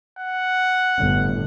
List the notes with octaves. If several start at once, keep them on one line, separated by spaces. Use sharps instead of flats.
F#5
G1 A2